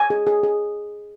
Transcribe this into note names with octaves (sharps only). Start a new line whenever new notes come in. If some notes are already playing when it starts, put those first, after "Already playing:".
Already playing: G#5
G#4
G#4
G#4